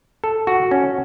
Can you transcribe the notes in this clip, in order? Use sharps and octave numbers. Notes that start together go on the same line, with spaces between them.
A4
F#4
C#4